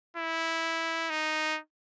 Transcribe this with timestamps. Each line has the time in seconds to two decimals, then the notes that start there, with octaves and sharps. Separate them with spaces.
0.17 E4
1.10 D#4